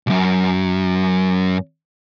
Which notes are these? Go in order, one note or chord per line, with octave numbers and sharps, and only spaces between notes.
B1 F#2